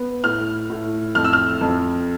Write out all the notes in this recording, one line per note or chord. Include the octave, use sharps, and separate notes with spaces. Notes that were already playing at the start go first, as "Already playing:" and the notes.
Already playing: B3
A2 F6
A2
F2 F6
E6
F6
F2